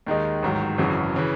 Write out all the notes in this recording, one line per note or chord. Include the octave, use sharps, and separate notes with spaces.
D#2 D#3 G#3 D#4
A1 G#2 D#3 F#3
G#1 F#2 C#3 E3 G#3
C#3 E3